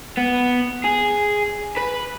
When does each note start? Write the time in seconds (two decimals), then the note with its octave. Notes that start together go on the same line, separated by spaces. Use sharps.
0.18 B3
0.84 G#4
1.77 B4